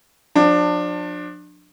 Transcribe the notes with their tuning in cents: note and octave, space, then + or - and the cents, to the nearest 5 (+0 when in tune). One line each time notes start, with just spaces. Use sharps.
F3 +40 D4 +20